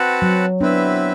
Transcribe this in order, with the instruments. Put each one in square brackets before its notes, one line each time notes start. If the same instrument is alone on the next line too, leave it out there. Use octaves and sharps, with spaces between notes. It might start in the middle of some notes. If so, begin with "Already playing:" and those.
Already playing: [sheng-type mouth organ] C4 F#4 B4 F#5 A5
[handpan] F#3
[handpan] B3 D4 [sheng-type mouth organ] C4 E4 B4 E5